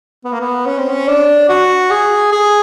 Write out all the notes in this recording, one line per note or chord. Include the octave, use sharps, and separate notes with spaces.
B3
A#3
B3
C#4
C4
C#4
D4
F#4
G#4
G#4